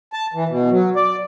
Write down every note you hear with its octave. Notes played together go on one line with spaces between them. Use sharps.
A5
E3
B2
F#3
D5